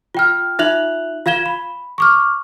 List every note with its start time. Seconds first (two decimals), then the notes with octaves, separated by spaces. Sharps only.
0.15 F4 G5 F6
0.59 D#4 F4 E5 F#6 F7 F#7
1.26 F4 F5 G#6 E7 G7
1.46 B5
1.98 C#6 D6 F6